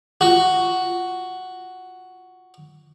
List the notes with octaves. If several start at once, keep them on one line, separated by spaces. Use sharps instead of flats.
F4 F#4